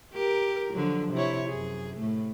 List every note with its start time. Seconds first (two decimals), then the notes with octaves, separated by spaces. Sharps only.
0.13 G4 A#4
0.74 D3 F3 F#3
1.13 C3 E4 C#5
1.49 F#2 G#4
1.97 A2 A3